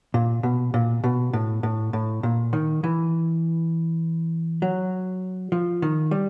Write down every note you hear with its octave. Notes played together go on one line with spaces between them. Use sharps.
A#2
B2
A#2
B2
A2
A2
A2
A#2
D#3
E3
F#3
F3
D#3
G3